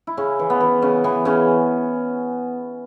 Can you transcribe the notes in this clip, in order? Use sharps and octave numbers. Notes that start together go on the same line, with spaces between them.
E4
C#3 C#4
E3
B3
E3
C#3 C#4
E3 B3
C#3 C#4